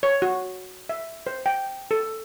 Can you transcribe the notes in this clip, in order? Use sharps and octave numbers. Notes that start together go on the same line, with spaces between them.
C#5
F#4
E5
C5
G5
A4